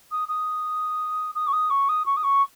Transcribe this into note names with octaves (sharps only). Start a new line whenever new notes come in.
D#6
D#6
D#6
C#6
D#6
C#6
D#6
C#6
D#6
C#6